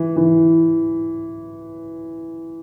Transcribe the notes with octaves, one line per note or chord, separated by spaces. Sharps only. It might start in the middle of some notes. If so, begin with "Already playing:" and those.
Already playing: E3
E3